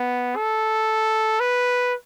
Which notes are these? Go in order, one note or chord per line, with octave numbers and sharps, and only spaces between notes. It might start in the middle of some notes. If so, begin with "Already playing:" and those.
Already playing: B3
A4
B4